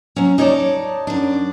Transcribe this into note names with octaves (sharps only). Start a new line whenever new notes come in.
F#3 C#4
D#4 C#5 D5 A5
F#2 D4